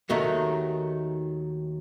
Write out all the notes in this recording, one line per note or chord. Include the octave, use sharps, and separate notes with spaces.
D#2 D#3 F#3 A3 D#4